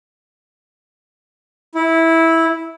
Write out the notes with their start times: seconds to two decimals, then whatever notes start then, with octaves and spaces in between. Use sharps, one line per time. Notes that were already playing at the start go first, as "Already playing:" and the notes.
1.75 E4